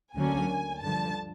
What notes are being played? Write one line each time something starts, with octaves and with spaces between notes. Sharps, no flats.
D2 D3 F#3 A#3 C#4 G#5
G2 D3 F3 A5